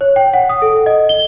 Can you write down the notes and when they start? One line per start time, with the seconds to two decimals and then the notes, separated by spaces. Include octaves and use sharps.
0.01 C#5
0.16 G5
0.34 F#5
0.49 D#6
0.62 A4
0.86 D#5
1.09 G7